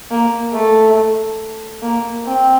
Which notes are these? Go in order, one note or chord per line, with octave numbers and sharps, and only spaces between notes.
A#3
A3
A#3
C4